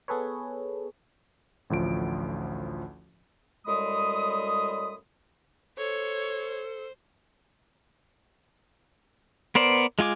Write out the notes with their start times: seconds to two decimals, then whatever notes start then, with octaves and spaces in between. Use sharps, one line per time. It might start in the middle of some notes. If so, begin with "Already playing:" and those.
0.08 B3 G#4 A4 B4 C#5
1.70 A1 D2 F3 D7
3.66 F#2 A2 G3 G#3 B5 D#6
5.78 A4 C5 C#5
9.55 B3 A#4 C5 D5
9.99 G#3 F4 G#5 D6